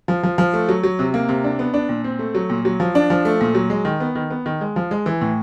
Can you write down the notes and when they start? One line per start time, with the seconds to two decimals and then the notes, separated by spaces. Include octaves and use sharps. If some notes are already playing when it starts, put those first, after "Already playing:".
0.08 F3
0.23 F3
0.38 F3
0.54 A3
0.69 F#3
0.83 F#3
0.99 C3
1.14 A#3
1.29 C3
1.44 D4
1.59 B3
1.74 D4
1.89 A#2
2.04 C4
2.19 A3
2.35 F#3
2.50 A#2
2.65 F#3
2.80 F3
2.95 D4
3.10 F3
3.25 A3
3.41 A#2
3.55 F#3
3.70 G#3
3.85 D#3
4.00 B3
4.15 D#3
4.30 B3
4.46 D#3
4.61 G#3
4.76 F3
4.91 G#3
5.06 E3
5.22 A2